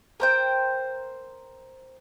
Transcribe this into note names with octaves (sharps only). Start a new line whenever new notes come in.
A#4 C5 G5